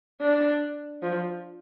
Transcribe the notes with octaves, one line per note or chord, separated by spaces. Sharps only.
D4
F3